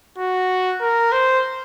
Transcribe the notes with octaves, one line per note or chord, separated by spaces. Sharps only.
F#4
A#4
C5